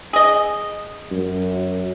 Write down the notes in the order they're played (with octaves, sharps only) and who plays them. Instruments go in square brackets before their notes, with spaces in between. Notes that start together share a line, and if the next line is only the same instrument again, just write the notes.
[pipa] G#4 D#5
[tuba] F#2